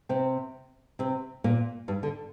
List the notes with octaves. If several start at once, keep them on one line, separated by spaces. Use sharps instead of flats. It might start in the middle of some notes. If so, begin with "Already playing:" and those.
C3 C4
C3 C4
A#2 A#3
G2 G3
D3